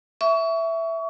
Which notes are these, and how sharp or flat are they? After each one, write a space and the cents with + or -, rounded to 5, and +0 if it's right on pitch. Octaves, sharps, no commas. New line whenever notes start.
E5 +0 C#6 +30